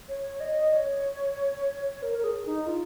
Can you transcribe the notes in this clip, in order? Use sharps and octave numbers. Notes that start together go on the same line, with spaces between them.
C#5
D#5
C#5
A#4
A#4
G#4
D#4
F4